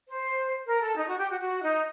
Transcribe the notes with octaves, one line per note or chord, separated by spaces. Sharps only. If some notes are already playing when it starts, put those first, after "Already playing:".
C5
A#4
A4
D#4
F#4
G4
F#4
F#4
D#4